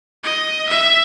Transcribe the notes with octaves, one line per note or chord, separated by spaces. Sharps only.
D#5
E5